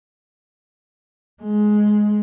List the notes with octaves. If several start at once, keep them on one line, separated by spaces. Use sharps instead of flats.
G#3